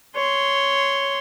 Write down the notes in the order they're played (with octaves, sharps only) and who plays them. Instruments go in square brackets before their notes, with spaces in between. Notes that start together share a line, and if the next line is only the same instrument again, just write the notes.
[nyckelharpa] C#5 C6